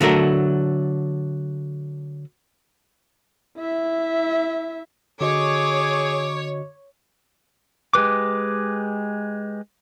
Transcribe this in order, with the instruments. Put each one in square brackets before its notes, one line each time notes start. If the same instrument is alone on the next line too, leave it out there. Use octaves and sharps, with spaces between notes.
[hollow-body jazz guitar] D3 F#3 A3 A#4
[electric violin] E4 E5
[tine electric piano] D3 F#4 D#5 [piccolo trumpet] G#4 [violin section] C#5 [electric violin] D6
[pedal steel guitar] G#3 G4 B4 D6